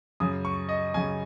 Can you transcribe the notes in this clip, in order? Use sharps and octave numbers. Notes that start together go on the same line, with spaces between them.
F#2 C#3 D#6
C#6
D#5
F#2 C#3 G#5